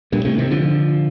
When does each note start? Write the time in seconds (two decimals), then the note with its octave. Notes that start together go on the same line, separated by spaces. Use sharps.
0.12 G2 A#2
0.25 A2 C3
0.38 C3 D#3
0.51 D3 F3